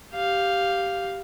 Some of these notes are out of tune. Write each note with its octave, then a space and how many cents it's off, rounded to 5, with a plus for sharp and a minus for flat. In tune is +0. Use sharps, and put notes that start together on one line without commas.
G4 +0 F5 +0